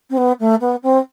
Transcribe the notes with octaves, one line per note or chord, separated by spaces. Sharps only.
C4
B3
A3
B3
C4